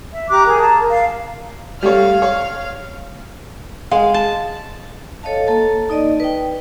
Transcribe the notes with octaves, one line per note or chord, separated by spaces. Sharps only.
E5
G4 A#5 D6 F#6
G#4 A#4
G#4 A5 A#5
A#4
F5
G3 A3 C#5 F5
C#5
G#3 F5
A5
A4 C#5 D#5 F5 A5
A#3 A4 A5
D#4 D5 D#5
B4 G5